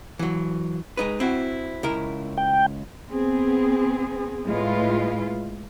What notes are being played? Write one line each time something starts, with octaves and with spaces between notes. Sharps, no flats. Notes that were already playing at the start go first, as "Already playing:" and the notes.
E3 F#3
G#3 D#4 B4
C4 E4 F#4
C#2 E4 A#4
G5
B3 C4 G#4
A2 G#3 E4 F4 B4